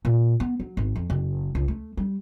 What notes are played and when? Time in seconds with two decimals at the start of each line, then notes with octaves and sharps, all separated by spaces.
0.05 A#2
0.40 B3
0.60 F#3
0.77 G#1
0.96 F2
1.10 F#1
1.55 C#2
1.68 A3
1.97 G3